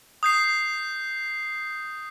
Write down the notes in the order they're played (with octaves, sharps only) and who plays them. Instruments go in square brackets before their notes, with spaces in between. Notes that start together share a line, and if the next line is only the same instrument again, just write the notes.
[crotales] D#6 G6 C7